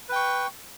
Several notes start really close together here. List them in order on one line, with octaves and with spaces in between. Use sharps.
B4 G5 C#6